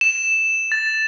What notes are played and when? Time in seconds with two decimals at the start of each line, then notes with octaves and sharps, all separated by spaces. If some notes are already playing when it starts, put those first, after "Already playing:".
0.01 E7
0.72 A6